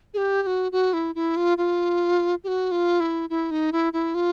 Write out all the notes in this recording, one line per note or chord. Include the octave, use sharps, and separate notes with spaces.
G#4
G4
G4
F#4
F#4
E4
E4
F4
F4
G4
F#4
F4
E4
E4
D#4
E4
E4
F4